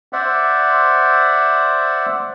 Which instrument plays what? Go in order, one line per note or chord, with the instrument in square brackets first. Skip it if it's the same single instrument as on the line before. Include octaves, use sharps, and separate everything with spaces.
[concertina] C5 D5 E5 F#5